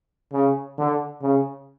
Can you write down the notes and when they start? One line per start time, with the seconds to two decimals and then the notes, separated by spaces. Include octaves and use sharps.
0.33 C#3
0.78 D3
1.22 C#3